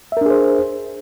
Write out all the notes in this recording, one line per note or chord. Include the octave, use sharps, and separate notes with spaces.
D4 G#4 A#4 C5 E5